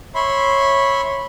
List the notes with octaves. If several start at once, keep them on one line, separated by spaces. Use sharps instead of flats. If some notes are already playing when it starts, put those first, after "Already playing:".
C#5 E5 B5 C6